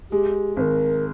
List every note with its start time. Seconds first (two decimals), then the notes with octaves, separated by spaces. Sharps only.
0.11 G#3 G4
0.57 G#1 C5
0.61 A#4